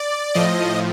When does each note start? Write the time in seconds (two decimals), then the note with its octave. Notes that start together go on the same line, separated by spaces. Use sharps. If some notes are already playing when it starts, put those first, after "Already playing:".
Already playing: D5
0.34 A2 F3 D#5